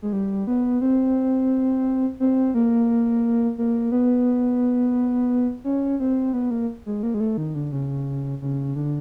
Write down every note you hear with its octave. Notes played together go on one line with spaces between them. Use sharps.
G#3
G3
B3
C4
C4
A#3
A#3
B3
C#4
C4
B3
A#3
G#3
A#3
G#3
A3
D#3
D3
C#3
C#3
D3